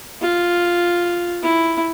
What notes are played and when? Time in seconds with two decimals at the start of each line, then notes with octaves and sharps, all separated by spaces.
0.22 F4
1.43 E4